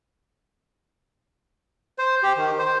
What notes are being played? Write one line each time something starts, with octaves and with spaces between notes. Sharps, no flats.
C5
G4
D#3
C5